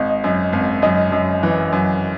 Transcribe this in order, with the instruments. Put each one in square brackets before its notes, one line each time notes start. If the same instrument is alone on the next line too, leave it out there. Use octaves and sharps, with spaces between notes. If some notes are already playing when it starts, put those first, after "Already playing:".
Already playing: [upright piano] G#1 [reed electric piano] D#5
[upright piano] F#2
G#1
[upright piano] F#2 [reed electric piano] D#5
[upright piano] F#2
E3
F#2